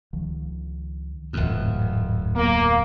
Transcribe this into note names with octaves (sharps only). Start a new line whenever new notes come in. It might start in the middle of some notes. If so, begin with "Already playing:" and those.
C#2 D#3 F3
D1 F2 G#2 E3 A3
F#3 A#3 B3